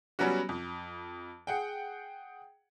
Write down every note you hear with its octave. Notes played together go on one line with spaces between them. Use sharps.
F#3 G3 B3 C#4 F#4
F2
G#4 F#5 G5